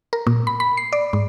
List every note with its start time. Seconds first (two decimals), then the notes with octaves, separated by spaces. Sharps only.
0.13 A#4
0.27 A#2
0.47 B5
0.60 B5
0.77 C7
0.93 D5
1.13 G#2